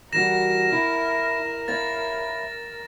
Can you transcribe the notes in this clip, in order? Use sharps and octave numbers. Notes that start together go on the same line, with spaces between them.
E3 G3 F#4 A#4 A#6 E7
E4
E4 C#5 F5 A6